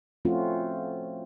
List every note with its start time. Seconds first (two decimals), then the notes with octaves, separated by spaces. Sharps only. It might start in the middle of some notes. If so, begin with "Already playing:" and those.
0.25 F3 A3 C4 C#4 F4 F#4